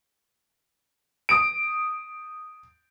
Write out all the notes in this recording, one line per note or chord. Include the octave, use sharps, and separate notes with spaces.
D#6 D7